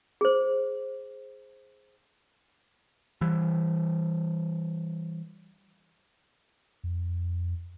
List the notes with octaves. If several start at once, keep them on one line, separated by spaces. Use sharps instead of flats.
G#4 C5
E3 G3
F2